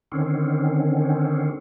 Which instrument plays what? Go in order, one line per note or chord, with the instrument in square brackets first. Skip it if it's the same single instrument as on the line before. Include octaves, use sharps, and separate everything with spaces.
[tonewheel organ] D3 D#3 C4 C#4